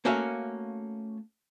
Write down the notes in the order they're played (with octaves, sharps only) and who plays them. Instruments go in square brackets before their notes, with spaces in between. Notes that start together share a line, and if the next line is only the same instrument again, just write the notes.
[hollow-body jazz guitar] A3 A#3 C#4 F#4 E5 F5